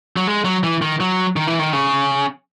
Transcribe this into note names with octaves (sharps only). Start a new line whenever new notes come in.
F#3
G#3
F#3
E3
D#3
F#3
D#3
E3
D#3
C#3